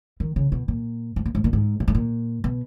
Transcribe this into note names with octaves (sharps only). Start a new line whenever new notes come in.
D#3
C#3
B2
A#2
G#2
A#2
G#2
A#2
G#2
A#2
G#2
A#2
B2